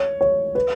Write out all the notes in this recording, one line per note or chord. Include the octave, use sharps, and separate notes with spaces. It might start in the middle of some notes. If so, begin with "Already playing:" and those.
Already playing: C#5
C#5
B4